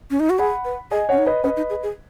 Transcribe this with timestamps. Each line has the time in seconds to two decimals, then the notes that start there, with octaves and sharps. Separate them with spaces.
0.11 C#4
0.20 D#4
0.30 F#4
0.39 G#4 F#5 B5
0.65 B4
0.91 G#4 D#5 G#5
1.09 C#4 C#5 F#5
1.18 D#4
1.26 B4 D#5
1.44 C#4 B4 D#5
1.57 D#4
1.70 G#4
1.83 G#4